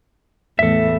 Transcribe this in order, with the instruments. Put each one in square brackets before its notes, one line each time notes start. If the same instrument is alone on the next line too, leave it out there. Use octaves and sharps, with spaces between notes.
[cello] E2 A2 [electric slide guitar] A4 E5